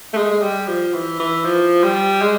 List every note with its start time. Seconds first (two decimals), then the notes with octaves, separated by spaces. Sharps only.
0.14 A3
0.17 G#3
0.31 G#3
0.42 G3
0.68 F3
0.94 E3
1.20 E3
1.45 F3
1.83 G3
2.22 G#3